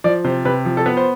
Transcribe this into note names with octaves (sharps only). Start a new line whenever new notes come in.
F3 D5
C3 C5
C3 B4
F3
A4
B3 B4
C5